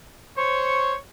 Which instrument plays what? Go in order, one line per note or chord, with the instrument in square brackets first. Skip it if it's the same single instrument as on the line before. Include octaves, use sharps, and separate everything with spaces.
[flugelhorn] C5 [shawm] C#5 [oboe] C#6